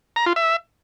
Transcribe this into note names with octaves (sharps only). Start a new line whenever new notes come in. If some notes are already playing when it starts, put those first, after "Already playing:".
A#5
F4
E5